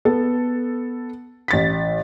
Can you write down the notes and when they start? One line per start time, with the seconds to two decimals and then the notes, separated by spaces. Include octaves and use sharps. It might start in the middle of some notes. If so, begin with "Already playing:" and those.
0.05 B3 A4
1.48 A1 A6 B6